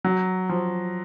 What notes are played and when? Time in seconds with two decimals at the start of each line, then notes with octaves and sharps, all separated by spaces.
0.04 F#3
0.49 F3